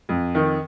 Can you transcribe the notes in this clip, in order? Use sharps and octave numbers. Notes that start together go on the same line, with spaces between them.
F2
D#3